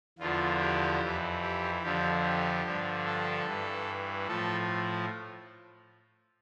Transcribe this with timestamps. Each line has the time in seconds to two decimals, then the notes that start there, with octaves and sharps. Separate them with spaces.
0.18 E2 D3 F3 F4
0.59 G4
1.01 F2 E3
1.42 G4
1.82 F2 D3 F3 G4
2.23 G4
2.65 G2 D3 F3
3.05 A4
3.45 G2 E3
4.27 A2 F3 A4